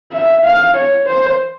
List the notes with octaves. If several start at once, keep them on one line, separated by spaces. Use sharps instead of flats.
E5
F5
C#5
C5